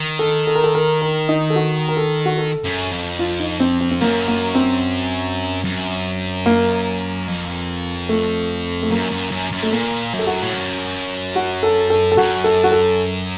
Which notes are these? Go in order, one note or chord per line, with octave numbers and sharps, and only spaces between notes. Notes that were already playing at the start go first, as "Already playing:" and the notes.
Already playing: D#3
A4
A4
A#4
A4
A#4
A#4
D#4
A4
F#4
A#4
A4
F#4
A4
F#2
F2
F4
D#4
C4
C4
C4
F#2 A#3
A#3
C4
F#2
A#3
F2
A3
A3
F#2 A#3
F#2
F#2
F#2
A3
A#2 A#3
F#2
A4
F#4
A2
F#2
F#4
A4
A4
A4
F#2 F#4
A4
F#4
A4